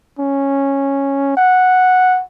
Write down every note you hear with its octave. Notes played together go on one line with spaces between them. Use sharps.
C#4
F#5